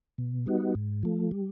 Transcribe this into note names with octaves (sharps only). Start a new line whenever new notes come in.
B2
G3 B3 D#4 F#4
G#2
F3 A3
G3